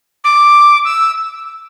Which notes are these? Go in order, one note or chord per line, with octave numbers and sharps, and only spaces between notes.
D6
E6